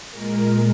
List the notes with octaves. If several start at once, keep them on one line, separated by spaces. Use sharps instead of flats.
A#2 G#3 A#4